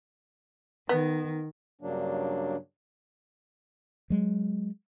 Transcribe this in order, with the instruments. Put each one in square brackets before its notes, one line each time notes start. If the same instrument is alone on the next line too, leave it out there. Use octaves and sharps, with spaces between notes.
[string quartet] D#3 [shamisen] B3
[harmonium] G2 C#3 F#3 A#3 D4
[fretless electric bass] F#3 G#3